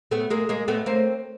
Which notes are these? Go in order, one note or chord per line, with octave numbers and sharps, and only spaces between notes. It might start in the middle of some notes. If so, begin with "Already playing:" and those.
A3 B3
G#3 A#3
G#3 A#3
A3 B3
A#3 C4